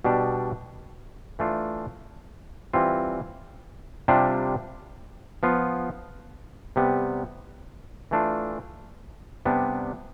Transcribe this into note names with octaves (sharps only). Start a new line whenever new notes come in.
B2 G3 D4
E3 A3 D4 F4
E3 G3 C4 F4
C3 G3 D4 F4
F3 B3 F4
C3 G3 B3
E3 A3 D4 F4
C3 G3 B3 D4